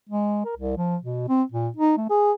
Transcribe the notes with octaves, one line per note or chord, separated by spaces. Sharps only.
G#3
A#4
C2
F3
B2
C4
A#2
D#4
A3
G#4